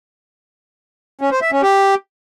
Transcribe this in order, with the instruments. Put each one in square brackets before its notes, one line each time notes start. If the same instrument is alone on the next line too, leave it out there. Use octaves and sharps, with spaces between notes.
[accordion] C#4
C5
E5
C#4
G4